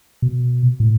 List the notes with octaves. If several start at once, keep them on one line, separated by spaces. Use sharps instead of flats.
B2
A2